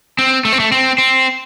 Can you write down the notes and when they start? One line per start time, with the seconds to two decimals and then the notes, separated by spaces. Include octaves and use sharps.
0.19 C4
0.45 A3
0.53 C4
0.60 A3
0.72 C4
0.98 C4